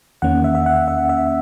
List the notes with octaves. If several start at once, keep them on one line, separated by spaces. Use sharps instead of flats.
E2 D#3 A#3 C#4 F#5
E5
E5
F#5
E5
E5